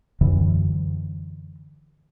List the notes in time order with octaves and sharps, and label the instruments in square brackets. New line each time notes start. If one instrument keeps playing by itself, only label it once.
[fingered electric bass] F#2 D3 E3